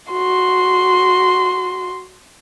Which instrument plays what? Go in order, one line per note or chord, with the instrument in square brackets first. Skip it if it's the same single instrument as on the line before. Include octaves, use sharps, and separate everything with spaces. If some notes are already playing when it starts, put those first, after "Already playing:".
[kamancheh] F#4 C6